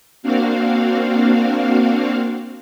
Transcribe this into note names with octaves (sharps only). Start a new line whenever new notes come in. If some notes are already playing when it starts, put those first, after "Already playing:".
A#3 C4 D4 F#4 F5